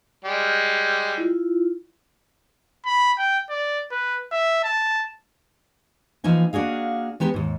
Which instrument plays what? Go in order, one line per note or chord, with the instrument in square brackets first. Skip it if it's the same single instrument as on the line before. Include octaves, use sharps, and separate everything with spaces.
[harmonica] G3 G#3
[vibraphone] E4 F4
[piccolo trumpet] B5
G5
D5
B4
E5
A5
[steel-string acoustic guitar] E3 F3 A#3 D#4 G#5
A#3 D4 F#4 G#4 F5
G#3 B3 G4 A#4 B4
D#2 G#2